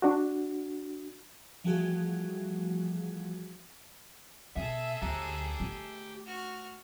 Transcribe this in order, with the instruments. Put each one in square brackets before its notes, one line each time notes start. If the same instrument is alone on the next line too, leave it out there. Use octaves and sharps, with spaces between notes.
[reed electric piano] D4 F#4
[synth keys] E3 F3 G3 A3 F#4 G#4
[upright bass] B2 [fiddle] G#4 A4 [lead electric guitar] E5
[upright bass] D2 [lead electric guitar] G4 A#5
[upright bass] A3
[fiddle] F#4 F6